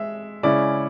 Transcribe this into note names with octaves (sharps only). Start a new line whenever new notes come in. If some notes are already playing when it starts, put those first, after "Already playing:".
Already playing: G#3 E5
C#3 G#3 C#4 E4 D5